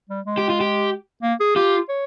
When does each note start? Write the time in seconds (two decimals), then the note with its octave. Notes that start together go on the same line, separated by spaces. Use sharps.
0.09 G3
0.26 G#3
0.37 G4
0.49 F4
0.61 G4
1.22 A#3
1.40 G#4
1.55 F4 G4
1.89 C#5